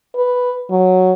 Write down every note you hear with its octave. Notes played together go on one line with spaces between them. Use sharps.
B4
F#3